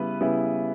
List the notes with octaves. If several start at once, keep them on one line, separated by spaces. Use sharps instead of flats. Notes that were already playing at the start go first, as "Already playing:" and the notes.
Already playing: C#3 G3 B3 E4 B4
C#3 G3 B3 E4 B4